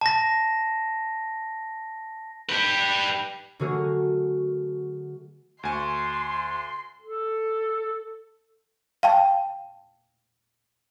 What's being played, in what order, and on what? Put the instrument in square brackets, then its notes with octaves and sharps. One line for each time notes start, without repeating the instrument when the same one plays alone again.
[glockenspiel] A5 A#6
[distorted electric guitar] G4 B4
[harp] D3 F#3 A3 F#4 G#4 A#4
[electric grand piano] D2 G#5 C#6 [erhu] C6
[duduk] A4
[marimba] F5 G5 A5